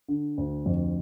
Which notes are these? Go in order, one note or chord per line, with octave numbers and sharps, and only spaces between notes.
D3
D2
F2